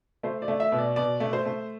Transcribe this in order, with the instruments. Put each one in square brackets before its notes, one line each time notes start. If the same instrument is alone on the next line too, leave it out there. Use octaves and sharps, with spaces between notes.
[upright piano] A3 C5
D5
A3
E5
B2
D5
B2 D5
A3
C5
A3